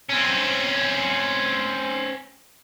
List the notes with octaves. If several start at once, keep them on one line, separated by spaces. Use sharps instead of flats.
C4 C#4